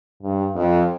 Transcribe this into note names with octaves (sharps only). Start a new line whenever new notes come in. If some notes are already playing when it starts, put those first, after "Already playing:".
G2
F2